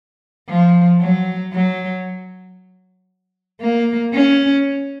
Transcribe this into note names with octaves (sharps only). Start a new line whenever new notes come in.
F3
F#3
F#3
A#3
C#4